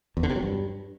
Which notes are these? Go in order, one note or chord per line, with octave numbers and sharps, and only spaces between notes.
E2
D3
C3
F#3
G2